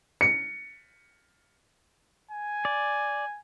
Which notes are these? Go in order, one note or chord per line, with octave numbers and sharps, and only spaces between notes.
C#7
G#5
D5